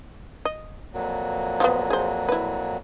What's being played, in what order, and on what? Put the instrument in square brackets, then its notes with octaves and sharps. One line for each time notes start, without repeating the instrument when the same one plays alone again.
[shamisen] D#5
[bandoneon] F2 A#2 F#3
[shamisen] F3 G3 B3
G#4 C5
E4 B4